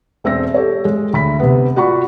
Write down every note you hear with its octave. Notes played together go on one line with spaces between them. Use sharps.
E1 C4 E5 E6 A#6
G4 A4 C#5
G#3
D2 B5 B6
C3 B3
F4 F#4 D5 F#5 B5 C#6